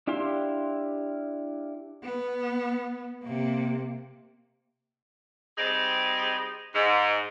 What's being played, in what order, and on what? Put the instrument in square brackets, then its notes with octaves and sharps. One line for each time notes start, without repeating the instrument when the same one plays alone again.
[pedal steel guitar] D4 E4 G4 F5 C6
[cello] B3
C3 A#3
[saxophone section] G3 C4 D#4 G4 G#4
G#2